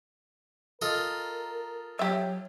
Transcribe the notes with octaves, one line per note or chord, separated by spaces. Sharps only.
F4 A4 A#4 D#5
F#3 G4 E5